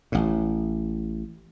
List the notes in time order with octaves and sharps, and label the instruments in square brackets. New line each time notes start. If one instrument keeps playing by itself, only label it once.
[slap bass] A1 A2